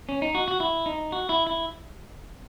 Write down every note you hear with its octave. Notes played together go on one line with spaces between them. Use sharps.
C#4
D#4
F#4
F#4
E4
D#4
F#4
E4
E4